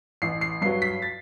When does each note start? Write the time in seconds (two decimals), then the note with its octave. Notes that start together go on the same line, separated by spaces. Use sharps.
0.22 A1 C7
0.41 C7
0.61 G2 F#3 C7
0.82 B6
1.02 A6